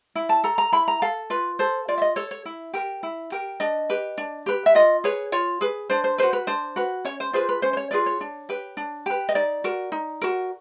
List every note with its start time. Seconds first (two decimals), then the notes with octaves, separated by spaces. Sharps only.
0.15 E4
0.29 A5
0.44 A4 A#5
0.58 A#5
0.72 E4 B5
0.88 A#5
1.02 A4 F5
1.30 F4 B4
1.59 A4 C5
1.88 F4 D5
1.98 E5
2.02 D#5
2.16 A4 C#5
2.31 C#5
2.45 E4
2.73 G4 A#4
3.03 E4
3.32 G4 A#4
3.60 D4 D#5
3.90 G4 B4
4.18 D4
4.46 G4 B4
4.66 E5
4.75 F4 D#5
5.04 G#4 B4 C#5
5.32 F4 C#5
5.61 G#4 B4
5.90 D4 C5
6.04 C5
6.18 F#4 B4 C5
6.33 B4
6.47 D4 C5
6.76 F#4 B4
7.05 C#4 C#5
7.20 C5
7.33 F4 G#4 B4 C5
7.49 B4
7.62 C#4 C5
7.73 C5
7.77 C#5
7.91 F4 G#4 B4 D5
8.06 C#5
8.21 D4
8.49 G4 B4
8.77 D4
9.06 G4 B4
9.29 D#5
9.35 D#4 D5
9.64 F#4 A#4
9.92 D#4
10.21 F#4 A#4